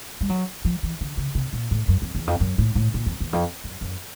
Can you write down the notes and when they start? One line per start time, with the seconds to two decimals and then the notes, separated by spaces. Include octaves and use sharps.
0.21 G3
0.29 F#3
0.65 F3
0.83 E3
1.01 D3
1.17 C#3
1.35 C3
1.53 A#2
1.71 A2
1.88 F#2
2.02 F2
2.15 E2
2.27 F2
2.40 F#2
2.58 A2
2.75 A2
2.94 A#2
3.06 F2
3.20 E2
3.33 F2
3.64 F#2
3.81 F#2